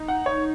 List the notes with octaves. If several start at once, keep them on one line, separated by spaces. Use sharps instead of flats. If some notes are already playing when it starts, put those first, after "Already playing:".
Already playing: D#4
F#5
C#5